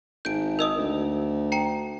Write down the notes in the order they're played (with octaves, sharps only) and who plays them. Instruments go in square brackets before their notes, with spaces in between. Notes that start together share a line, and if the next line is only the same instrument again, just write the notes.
[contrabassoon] G#1 [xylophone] G6 D7
[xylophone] A#4 D#5 D#6
[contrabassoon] D2
[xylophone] G5 A#5 C#7